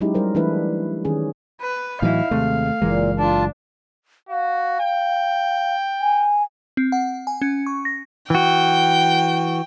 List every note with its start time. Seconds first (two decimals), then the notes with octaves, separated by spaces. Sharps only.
0.01 F#3 G#3 C#4 D#4 E4 G4
0.14 G3 A#4 C5
0.35 E3 A3 D4 E4 B4
1.05 D#3 C#4 G#4
1.61 B4
2.02 A2 E3 F#3 D#4 E4 F5
2.31 D#2 C3 G#3 A3
2.82 F#1 A#2 E3 G#3 A#3
3.19 D4 F4 A5
4.29 F#4 F5
4.80 G5
6.01 G#5
6.77 C4
6.92 F#5
7.27 G#5
7.42 C#4
7.66 C#6
7.85 A#6
8.30 E3 F#4 G5